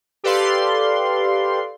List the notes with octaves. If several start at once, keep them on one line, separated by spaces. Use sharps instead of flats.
G4 A4 B4 D5 F5 C6